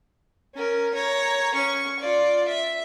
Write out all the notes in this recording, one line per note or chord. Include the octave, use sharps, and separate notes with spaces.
C#4 A#4
C#5 A#5
C#4 C#6
F4 D5
E5